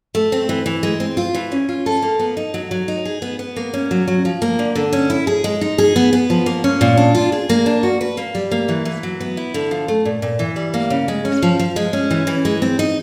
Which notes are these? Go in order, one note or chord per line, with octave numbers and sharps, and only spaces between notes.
A3
C4
E3
E3
G#3
C4
F4
E3
C#4
F4
A4
A#3
B3
D#4
F#3
F#3
D#4
G#4
B3
B3
A#3
C#4
F#3
F#3
F3
A#3
D3
D3
C#4
E4
G#4
G#3
D#4
G#4
B3
B3
F3
A#3
C#4
A#2
D4
F4
G#4
A#3
D4
F#4
B4
A#3
G3
A#3
E3
E3
F#3
B3
E4
D3
F3
A3
A#2
A#2
E3
G3
A#3
C#3
G#3
C#4
F3
F3
G#3
C#4
E3
E3
G#3
C4
D#4